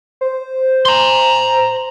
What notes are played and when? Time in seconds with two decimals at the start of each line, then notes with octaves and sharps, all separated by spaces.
0.21 C5
0.85 A#5 C6